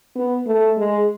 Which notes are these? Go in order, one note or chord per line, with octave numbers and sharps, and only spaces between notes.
B3
A3
G#3